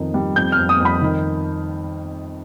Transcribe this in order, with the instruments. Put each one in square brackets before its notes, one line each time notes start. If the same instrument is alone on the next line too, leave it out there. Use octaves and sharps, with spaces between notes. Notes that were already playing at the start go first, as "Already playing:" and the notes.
Already playing: [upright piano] F2 D#3 D#4
G3
F2 G6
F6
F2
D#6
F2
B5
D#3